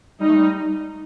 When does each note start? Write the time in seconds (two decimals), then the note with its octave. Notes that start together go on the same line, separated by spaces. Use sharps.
0.20 G3 D#4
0.28 A3
0.36 G3